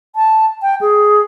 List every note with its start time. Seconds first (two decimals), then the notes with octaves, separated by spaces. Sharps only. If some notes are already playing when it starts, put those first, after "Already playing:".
0.16 A5
0.62 G5
0.81 G#4